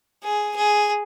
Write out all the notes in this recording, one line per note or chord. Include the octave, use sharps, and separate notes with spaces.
G#4
G#4